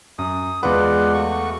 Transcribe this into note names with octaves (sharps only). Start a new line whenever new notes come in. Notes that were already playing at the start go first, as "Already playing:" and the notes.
F#2 D#6
E2 G#3 F4 B4 D5 F#5
A3 F#4 C#6